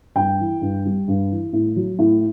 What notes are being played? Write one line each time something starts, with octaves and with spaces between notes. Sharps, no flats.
G2 G5
E3
G2
G3
G2
E3
A2
F#3
A2